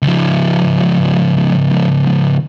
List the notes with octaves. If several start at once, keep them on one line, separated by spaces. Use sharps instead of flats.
C#2 F3